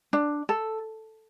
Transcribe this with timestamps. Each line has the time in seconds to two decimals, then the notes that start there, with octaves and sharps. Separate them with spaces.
0.13 D4
0.49 A4